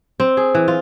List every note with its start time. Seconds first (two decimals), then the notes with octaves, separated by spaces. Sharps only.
0.20 C4
0.37 G#4
0.55 E3
0.68 F4